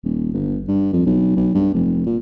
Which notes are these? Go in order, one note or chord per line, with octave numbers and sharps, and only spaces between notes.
D#1
G1
G2
F2
B1
B1
G2
F1
A#2